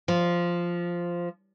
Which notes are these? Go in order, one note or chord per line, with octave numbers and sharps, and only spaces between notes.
F3